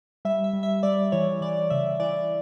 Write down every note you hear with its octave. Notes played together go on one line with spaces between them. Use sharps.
G3 E5
E5
G3
E5
G3 D5
E3 C#5
E3 D5
C#3 E5
E3 D5